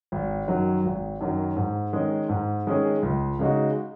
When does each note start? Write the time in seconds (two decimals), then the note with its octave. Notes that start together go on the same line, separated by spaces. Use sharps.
0.12 G#1
0.47 F#2 D#3 F#3
0.85 G#1
1.21 F#2 D#3 F#3
1.57 G#2
1.93 D#3 G#3 C#4 G#4
2.29 G#2
2.67 D#3 G#3 C#4 G#4
3.03 C#2
3.39 C#3 G#3 D#4 F#4